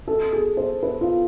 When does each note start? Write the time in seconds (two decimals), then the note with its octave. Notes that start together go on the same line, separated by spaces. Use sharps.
0.08 A4
0.33 G#4
0.57 C5
0.83 B4
1.01 F4